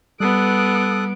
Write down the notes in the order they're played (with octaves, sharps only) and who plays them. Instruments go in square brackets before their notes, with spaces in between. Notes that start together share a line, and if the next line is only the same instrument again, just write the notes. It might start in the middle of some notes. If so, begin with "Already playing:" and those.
[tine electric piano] G3 [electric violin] B3 D7 [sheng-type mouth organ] A4 D#6 F#6